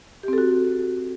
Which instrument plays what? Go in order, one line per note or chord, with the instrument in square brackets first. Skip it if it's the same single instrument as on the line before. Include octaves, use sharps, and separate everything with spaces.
[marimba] G4
C4
A4
F#4